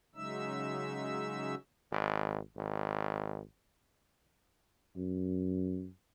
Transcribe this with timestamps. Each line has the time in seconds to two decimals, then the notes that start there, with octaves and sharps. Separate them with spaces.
0.15 C#3 F#3 G#3 D#4 E5 E6
1.92 G#1
2.57 G#1
4.96 F#2